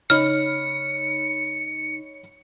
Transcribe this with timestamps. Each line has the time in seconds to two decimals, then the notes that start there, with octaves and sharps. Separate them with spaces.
0.10 C#3 D#4 C#5 D#5 B5 F6 C#7